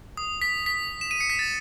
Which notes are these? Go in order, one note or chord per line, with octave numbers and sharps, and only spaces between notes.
D#6
B6
B6
E7
D#7
C#7
B6
A6